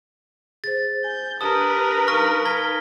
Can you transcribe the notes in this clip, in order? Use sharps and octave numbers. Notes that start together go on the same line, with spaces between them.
G#4 C5 A6
G#5 G6
D4 G4 A#4 B4 A5 D#6
G3 D#4 F5 C#6 F6 A#6
G#6 B6 G7